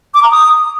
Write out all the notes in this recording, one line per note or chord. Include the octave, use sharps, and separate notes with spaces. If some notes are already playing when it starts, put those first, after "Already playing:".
D6
A#5
D#6